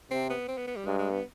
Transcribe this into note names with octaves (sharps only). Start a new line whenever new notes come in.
C3 C4
B3
C4
B3
B3
G3
G2 G#3
G#3
B3